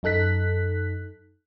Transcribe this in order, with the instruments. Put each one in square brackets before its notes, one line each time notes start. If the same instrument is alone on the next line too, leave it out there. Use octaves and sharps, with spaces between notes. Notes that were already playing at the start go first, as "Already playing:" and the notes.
[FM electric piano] F#2 D#4 A4 F#6 B6